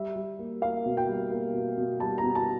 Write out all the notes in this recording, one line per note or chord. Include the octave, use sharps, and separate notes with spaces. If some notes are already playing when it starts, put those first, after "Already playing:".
Already playing: G3 E5
G3
A#3
A#3 F5
B2
G5
G3
A#3
B2
B2
G3 A5
A#5
B2
A5